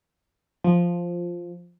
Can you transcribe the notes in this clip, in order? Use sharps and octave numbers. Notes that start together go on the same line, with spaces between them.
F3